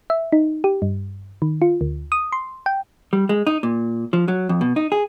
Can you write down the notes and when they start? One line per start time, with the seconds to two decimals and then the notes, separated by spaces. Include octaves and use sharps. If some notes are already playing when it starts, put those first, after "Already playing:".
0.10 E5
0.32 D#4
0.64 G4
0.82 G2
1.42 D#3
1.62 F4
1.81 D2
2.12 D#6
2.32 C6
2.66 G5
3.13 G3
3.29 G#3
3.47 D#4
3.63 A#2
4.13 F3
4.28 F#3
4.49 F2
4.61 B2
4.76 D#4
4.92 G#4